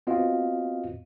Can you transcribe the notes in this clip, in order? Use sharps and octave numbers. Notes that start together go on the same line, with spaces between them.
B3 C4 F4 F#4 D#5 F5